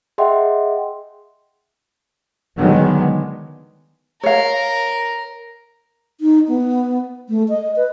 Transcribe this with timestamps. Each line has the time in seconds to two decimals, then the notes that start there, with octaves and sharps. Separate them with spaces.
0.18 G#4 D#5 E5 F#5 G5 C6
2.57 D3 D#3 F#3 G#3 B3
4.23 A#4 C#5 F5
6.21 D#4
6.48 B3
7.29 A3
7.49 D#5
7.76 B4